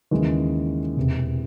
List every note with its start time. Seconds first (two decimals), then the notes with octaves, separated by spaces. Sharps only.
0.11 D#2 C#3 E3 G#3
0.97 E1 E2 C3